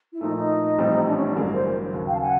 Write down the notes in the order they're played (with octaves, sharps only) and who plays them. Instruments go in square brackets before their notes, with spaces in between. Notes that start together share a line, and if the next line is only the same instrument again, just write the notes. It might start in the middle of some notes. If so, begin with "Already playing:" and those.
[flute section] E4
[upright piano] A#2 F3 A3 [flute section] D#4
[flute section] D#4
[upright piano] A#1 A2 E3 G3 C4
[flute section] D4
C#4
D4
[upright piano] A1 G2 D3 F#3 A#3 [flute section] G#4
[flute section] A#4
C5
[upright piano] D#2 C#3 F#3
[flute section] F5 G5
A5
F#5 G#5